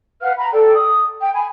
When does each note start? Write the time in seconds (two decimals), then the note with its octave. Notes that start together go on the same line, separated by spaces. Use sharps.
0.21 B4 F5 F#5 F6
0.37 A#5 B5
0.52 A4 D5 G5
0.74 D#6
1.20 G5
1.33 G#5 B5